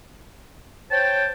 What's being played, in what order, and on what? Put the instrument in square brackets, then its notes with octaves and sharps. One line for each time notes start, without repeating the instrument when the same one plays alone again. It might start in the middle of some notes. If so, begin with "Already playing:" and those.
[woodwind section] C5 C#5 G5 [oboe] A5